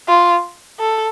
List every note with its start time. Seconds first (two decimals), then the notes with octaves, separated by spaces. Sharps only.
0.08 F4
0.80 A4